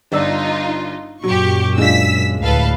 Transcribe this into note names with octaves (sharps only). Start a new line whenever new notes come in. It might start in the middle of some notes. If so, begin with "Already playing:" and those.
G1 D#4 F4 D5 E6
F#2 A#2 F#3 G4 C#6
G#3 D4 F4 E6 B6
D2 A2 A4 B4 F5